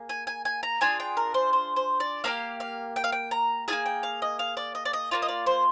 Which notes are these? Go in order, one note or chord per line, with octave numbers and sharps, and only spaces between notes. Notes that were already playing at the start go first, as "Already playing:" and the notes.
Already playing: A#3 G#4
G#5
G#5
G#5
A#5
D4 F4 G#4 G#5
G5
A#4
C5
C5
C5
D5
A#3 D4 G4 F5
F5
G5
F5
G5
A#5
A#3 F4 G#4 G#5
G5
F5
D#5
F5
D5
D#5
D5
D#5
A#3 D4 F4 D5
D#5
D5
C5